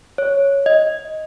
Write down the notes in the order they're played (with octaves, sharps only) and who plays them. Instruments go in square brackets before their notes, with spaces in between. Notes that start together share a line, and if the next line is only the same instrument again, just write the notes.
[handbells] C#5
D#5